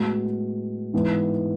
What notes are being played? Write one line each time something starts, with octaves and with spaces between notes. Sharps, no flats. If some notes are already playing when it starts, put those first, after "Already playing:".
Already playing: A2 G#3 B3 F#4
G#2 E3 B3